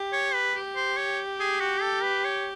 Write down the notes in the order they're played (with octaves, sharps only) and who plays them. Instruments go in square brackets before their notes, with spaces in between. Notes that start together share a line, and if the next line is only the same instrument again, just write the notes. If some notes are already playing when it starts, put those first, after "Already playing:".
Already playing: [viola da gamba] G4
[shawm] C#5
B4
[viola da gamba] G4
[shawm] C5
C#5
G#4
F#4
A4
B4
C#5